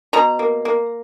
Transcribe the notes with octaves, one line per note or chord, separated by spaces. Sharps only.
B2 A#5
A#3
A#3